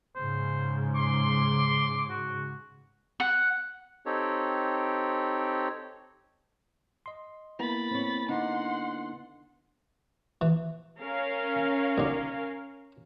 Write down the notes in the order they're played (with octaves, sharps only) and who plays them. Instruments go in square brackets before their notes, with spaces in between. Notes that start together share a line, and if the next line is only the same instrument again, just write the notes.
[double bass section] G#2 C#3 [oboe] C5
[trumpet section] C6 [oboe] D6
[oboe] F#4
[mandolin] F#5
[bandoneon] C4 D#4 G4 A4 C#5
[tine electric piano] D#5 C6
[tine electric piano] A#3 B3 E4 [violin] B5 A6
[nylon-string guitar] C4 C#5
[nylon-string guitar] D3 D4 D#4 [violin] F#5 C6
[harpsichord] E3
[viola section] C#4 A#4 F5
[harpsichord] B1 D3